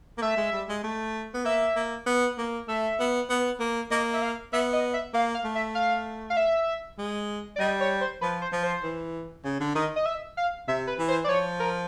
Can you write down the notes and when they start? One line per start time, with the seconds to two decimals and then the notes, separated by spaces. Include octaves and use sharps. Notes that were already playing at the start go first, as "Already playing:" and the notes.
0.18 A#3
0.22 A3 E5
0.37 G#3
0.52 G3
0.69 G#3
0.83 A3
1.34 B3
1.45 A#3 E5
1.76 A#3
2.06 B3
2.38 A#3
2.68 A3 E5
2.99 B3
3.29 B3
3.60 A#3
3.91 A#3 D#5
4.14 E5
4.22 F5
4.52 B3 E5
4.73 D#5
4.93 E5
5.14 A#3 F5
5.35 F5
5.44 A3
5.55 E5
5.75 F5
6.30 F5
6.37 E5
6.98 G#3
7.56 D5
7.59 G3 D#5
7.80 C#5
8.01 C5
8.21 F3 B4
8.42 C5
8.52 F3
8.63 C5
8.83 E3
9.44 C#3
9.60 D3
9.75 D#3 D#5
9.96 D#5
10.06 E5
10.37 F5
10.68 C3 E5
10.87 B4
10.99 E3
11.08 C5
11.24 D5
11.29 F3 C#5
11.60 A#4